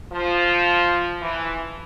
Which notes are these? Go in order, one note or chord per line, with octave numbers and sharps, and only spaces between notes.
F3
E3